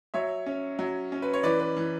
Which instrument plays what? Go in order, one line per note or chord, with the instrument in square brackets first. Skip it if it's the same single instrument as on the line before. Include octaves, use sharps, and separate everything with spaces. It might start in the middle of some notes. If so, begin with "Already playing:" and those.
[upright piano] F#3 C#5 E5
C#4
F#3
C#4
B4
C#5
E3 B4 D5
B4
E3